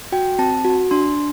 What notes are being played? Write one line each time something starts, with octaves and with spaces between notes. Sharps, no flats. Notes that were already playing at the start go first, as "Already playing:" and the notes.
F#4 G5
C4 A5
F#4
D4 C6